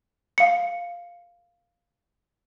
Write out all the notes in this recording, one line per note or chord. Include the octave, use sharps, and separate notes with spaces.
F5 C#7